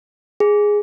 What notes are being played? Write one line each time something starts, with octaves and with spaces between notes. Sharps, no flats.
G#4